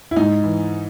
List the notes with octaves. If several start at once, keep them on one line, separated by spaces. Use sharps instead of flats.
E4
G#2 D#4
E3